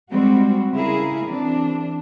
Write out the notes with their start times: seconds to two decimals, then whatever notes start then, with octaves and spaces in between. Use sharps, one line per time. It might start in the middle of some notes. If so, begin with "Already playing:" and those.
0.10 G3 G#3 C4 F#4
0.72 C#3 G3 E4 G#4 A#4
1.27 E3 C4 D4